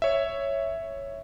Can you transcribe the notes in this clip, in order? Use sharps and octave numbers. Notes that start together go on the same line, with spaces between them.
C#5 E5